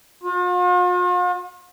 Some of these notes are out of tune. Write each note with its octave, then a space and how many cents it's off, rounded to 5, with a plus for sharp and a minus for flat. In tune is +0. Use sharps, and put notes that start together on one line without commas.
F4 +45